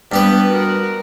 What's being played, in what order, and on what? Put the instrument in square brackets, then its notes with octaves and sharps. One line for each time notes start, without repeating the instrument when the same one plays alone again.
[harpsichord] G2 G4 B4 [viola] B3
[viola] F#4 A#4